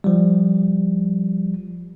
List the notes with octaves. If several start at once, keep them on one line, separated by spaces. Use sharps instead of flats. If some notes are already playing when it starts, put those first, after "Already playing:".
F3 G3